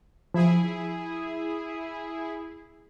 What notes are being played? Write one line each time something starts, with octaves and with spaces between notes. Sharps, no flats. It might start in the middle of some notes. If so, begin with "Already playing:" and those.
F3 E4 G#4